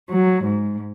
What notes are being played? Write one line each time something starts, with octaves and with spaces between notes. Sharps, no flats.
F#3
G#2